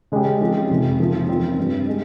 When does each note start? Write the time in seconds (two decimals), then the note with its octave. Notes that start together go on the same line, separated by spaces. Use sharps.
0.12 C#3 G#3 C#4 G4
0.41 F3 G#3 C4 G4
0.70 F2 C3 D#3
0.99 C#3 F3 A#3
1.28 F3 C4 F4
1.58 G2 G3 C4
1.87 G#3 D#4 G4